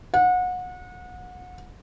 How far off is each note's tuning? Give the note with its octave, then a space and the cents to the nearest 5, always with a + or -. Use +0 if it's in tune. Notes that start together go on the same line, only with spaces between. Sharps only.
F#5 -30